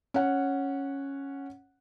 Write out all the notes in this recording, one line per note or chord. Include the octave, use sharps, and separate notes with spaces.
C#4 F#5